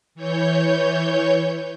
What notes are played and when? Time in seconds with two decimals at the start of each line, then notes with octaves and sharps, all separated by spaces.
0.15 E3 C#5 G6